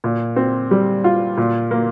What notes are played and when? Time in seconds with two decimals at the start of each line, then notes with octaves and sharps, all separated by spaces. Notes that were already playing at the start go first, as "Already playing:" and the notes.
0.04 A#2
0.36 C4
0.71 G3
1.04 F4
1.37 A#2
1.71 A#3